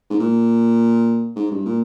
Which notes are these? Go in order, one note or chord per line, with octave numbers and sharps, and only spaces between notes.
G#2
A#2
G#2
G2
A#2